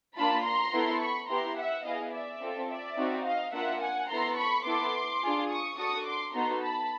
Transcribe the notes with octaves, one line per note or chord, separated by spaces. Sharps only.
A#3 D4 F4 A5 B5
A#5 C6
B3 E4 A4
B5 C#6
B3 E4 G4 A#5 C6
E5 F#5
B3 E4 G#4 D#5 F5
D5 E5
C4 F4 A4
D5 E5
C4 D#4 F#4
D#5 F5
A#3 D4 F4 E5 F#5
F#5 G#5
B3 E4 A4 A#5 C6
B5 C#6
B3 E4 A4 C6 D6
D4 F4 G#4
C#6 D#6
D4 F#4 A4 C#6 D#6
C6 D6
B3 D#4 F#4 A4 A#5 C6
A5 B5